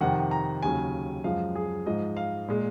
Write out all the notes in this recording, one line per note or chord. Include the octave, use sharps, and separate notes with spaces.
F2 C3 D#3 F#5
A#5
D#2 C#3 F#3 G#5
F#2 F3 G#3 F5
G#4
G#2 F3 G#3 D#5
F5
A#2 G#3